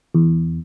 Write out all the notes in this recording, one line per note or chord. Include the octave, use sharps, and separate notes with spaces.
E2